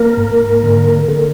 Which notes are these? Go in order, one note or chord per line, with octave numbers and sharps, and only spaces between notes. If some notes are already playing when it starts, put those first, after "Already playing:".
Already playing: A#3 A#4
G#2
D3
D3